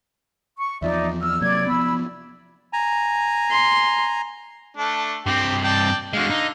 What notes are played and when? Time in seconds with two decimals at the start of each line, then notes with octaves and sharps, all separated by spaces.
0.58 C#6
0.82 E2 F3 D#4 D5 E5
1.22 E6 F6
1.41 C3 F#3 A#3 D5 G#6
1.67 F3 B3 B5 E6
2.73 G#5 A#5
3.50 C6
4.77 A3 D4
5.26 G2 C4 G4 G5
5.64 D5 G5 A5
6.13 D3 G#3 F#4 F5
6.30 D#4